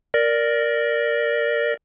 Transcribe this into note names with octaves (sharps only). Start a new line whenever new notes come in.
A#4 D5 A#6